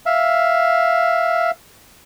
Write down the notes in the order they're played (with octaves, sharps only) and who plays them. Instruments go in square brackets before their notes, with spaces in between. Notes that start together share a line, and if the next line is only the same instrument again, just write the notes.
[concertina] E5 F5